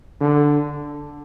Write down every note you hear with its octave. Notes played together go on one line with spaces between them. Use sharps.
D3